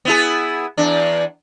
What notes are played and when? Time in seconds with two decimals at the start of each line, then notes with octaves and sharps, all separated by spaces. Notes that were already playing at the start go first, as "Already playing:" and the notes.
0.05 B3 E4 G#4
0.77 E2 D4